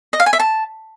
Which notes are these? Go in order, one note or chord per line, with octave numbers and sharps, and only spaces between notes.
D#5
F5
G#5
E5
A5